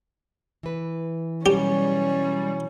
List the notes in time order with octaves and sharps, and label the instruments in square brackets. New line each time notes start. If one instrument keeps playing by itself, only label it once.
[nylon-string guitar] E3 B4
[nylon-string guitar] B2 E3 F#3 [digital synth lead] G3 [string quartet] C#4 [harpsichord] G4